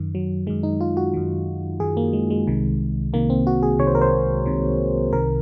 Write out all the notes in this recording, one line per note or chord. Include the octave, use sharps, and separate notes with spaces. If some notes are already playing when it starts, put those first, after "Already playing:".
Already playing: F#2 D#3
F#3
F#2 D#3 G#3
D#4
F4
F#4
F#2 D#3
F#2 D#3 G#4
A#3
G#3
G#3
C2 C3 D#3
C2 C3 D#3 A#3
C4
F#4
G#4
C2 C3 D#3 C#5
C5
A#4
C5
C2 C3 D#3
C2 C3 D#3 A#4